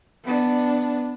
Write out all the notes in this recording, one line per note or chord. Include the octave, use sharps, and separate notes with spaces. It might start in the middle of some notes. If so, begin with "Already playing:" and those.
B3 D4